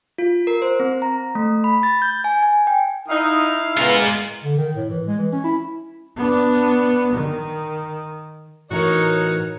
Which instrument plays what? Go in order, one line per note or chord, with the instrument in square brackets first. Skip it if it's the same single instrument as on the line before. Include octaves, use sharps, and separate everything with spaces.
[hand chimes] F4
A#4
C5
C4
A#5
A3
B5
A6
G6
G#5
G#5
G5
[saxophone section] D#4 [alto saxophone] E4 [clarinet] F5
[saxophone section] C#3 G#3 B3 [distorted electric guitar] F4 A#4
[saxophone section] G#3
[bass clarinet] D3
D#3
A2
E3
G#3
E3
C#4
E4
[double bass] B3 D4
D#3
[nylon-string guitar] A2 E3 A3 [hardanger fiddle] D#4 A#4 [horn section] F#4 C#5